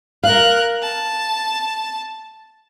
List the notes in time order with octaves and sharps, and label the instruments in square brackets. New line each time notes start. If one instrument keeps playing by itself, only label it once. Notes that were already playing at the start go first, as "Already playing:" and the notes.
[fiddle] A#4 F#6 [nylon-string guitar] F5
[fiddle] A5